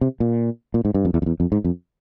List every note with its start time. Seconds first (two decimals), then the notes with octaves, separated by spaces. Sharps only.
0.01 C3
0.20 A#2
0.74 A#2
0.85 G#2
0.94 G2
1.05 F2
1.14 E2
1.22 F2
1.26 E2
1.40 F2
1.52 G#2
1.64 F2